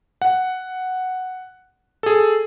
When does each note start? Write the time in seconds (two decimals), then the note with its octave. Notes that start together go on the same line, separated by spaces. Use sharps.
0.22 F#5
2.03 G#4 A4